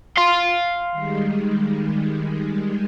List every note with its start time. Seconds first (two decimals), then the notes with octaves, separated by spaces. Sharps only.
0.18 F5 C6
0.92 D#3 G3 G#3